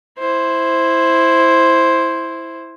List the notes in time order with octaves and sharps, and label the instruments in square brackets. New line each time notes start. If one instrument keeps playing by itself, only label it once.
[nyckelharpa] E4 C5